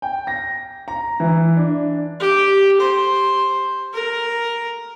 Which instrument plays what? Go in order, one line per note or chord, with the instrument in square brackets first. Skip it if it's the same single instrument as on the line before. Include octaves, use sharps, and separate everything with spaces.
[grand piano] G5
A#6
A#5
E3
D4
[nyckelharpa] G4
C5
A#4